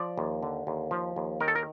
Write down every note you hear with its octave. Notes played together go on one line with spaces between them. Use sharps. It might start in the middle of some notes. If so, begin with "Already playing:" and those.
Already playing: F3 D5
D#2
D3
D#2
F3
D#2
D#3 A#4
A4
A#4